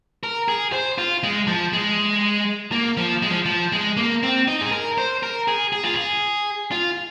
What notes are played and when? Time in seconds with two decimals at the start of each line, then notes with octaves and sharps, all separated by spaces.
0.23 A#4
0.48 G#4
0.72 C5
0.98 F4
1.23 G#3
1.47 F3
1.73 G#3
2.72 A#3
2.97 F3
3.22 G#3
3.31 F3
3.45 F3
3.72 G#3
3.97 A#3
4.23 C4
4.47 D#4
4.61 G#4
4.72 A#4
4.98 C5
5.23 A#4
5.48 G#4
5.73 G#4
5.84 F4
5.94 G#4
6.72 F4